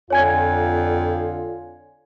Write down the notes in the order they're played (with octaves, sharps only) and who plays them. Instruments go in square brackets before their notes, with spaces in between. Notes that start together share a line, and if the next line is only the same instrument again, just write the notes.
[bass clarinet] F2 [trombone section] D3 F4 [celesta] C#5 G#5 G#6